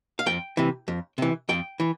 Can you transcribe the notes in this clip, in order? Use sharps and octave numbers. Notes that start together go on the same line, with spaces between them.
F5
F2 G5
C3 E3
F2
C3 E3
F2 G5
E3